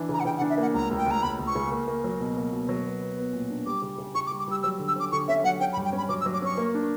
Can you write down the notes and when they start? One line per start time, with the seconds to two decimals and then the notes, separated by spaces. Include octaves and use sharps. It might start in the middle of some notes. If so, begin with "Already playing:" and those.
Already playing: E3 D4
0.09 C#3 A#5
0.20 F#5
0.25 C#3 G5
0.37 F#5
0.41 D4
0.50 E5
0.57 A#3 F#5
0.74 C#2 A#5
0.91 C#2
0.97 G5
1.06 C#2 A#5
1.23 C#2 B5
1.39 C#2
1.47 C#6
1.55 C#3
1.71 A#3
1.87 A#3
2.04 F#3
2.20 B2
2.37 A#3
2.52 B2
2.69 F#3
2.85 B3
3.01 B3
3.17 B3
3.33 A#2
3.50 D4
3.66 G3 D6
3.82 C#3
3.98 C#3
4.15 C#3 C#6
4.27 D6
4.31 G3
4.39 D6
4.48 G3 E6
4.63 F#3 E6
4.79 D3
4.88 E6
4.96 C#4 D6
5.12 D3 C#6
5.28 C#4 E5
5.44 F#3 F#5
5.60 C#4 G5
5.73 B5
5.77 G2
5.85 G5
5.93 C#4 B5
6.09 F#3 D6
6.21 E6
6.26 F#3
6.33 D6
6.42 C#4 C#6
6.57 A#3
6.75 D4